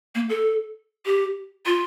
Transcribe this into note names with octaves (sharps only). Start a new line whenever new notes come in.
A#3
A4
G4
F4